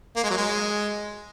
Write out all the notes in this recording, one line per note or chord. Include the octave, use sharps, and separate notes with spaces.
A#3
G#3
F#3
G#3